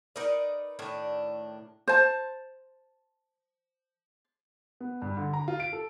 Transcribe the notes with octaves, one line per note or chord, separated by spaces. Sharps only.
D#4 A#4 B4 D5
A2 D#3 D4
C5 A5
B3
G2
D3
A#5
F4
D7
A4